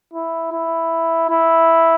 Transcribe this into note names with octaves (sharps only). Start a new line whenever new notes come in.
E4
E4
E4